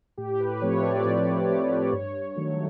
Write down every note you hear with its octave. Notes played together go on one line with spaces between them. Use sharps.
A2 G4
B4
F3 A3 C4 C#5
D5
A2
F3 A3 C4
G2 C#5
D#3 F#3 A3